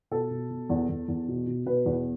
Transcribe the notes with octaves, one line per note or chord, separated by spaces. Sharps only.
B2 A4
B2
B2
E2
E2
E2
B2
B2
B2 B4
E2